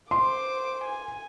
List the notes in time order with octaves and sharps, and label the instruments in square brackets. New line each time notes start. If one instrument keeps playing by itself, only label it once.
[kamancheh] C5 D6 [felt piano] C6
[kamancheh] G#5